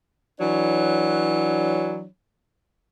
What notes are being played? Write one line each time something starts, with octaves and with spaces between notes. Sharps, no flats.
E3 F#3 D4 C#5